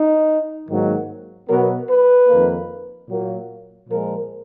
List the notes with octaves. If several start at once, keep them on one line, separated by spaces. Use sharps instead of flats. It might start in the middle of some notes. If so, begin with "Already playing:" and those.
Already playing: D#4
G#2 D#3 F#3 A#3
B2 F#3 B3 A#4
B4
F2 D#3 A#3
A#2 F#3 A#3
A#2 F3 G#3 A#4